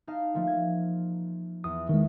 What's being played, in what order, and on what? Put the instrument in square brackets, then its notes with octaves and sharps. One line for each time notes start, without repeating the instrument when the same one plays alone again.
[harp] D#4 F5 A5
F3 A3 A#3
G#6
[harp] E2 [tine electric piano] D#6
[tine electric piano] D#3 G#3